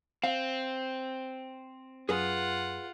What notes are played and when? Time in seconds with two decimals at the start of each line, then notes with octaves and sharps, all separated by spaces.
0.24 C4 F5
2.09 F#2 F4 G#4 B4 F#5